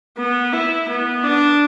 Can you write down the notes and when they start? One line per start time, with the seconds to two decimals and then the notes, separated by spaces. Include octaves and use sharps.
0.18 B3
0.53 E4
0.89 B3
1.23 D4